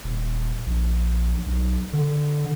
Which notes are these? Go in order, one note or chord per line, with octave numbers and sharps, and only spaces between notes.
D#1
A#1
B1
D3